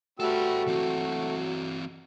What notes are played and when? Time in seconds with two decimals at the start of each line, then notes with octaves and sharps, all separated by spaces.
0.20 G3 A3 F#4 A4 B4 G5 E6
0.68 E3 F#3 C4